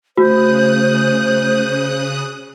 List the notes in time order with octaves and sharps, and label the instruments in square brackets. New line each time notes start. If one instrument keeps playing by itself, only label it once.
[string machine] C#3 D#6 F#6 [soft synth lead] A3 [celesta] F#4 [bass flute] C5